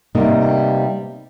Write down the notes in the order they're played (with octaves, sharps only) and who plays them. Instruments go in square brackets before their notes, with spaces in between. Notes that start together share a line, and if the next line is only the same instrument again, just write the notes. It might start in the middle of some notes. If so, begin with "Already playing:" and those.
[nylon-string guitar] C3 G3 A#3 B3 D#4 G4